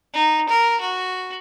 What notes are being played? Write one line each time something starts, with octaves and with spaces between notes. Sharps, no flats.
D#4
A#4
F#4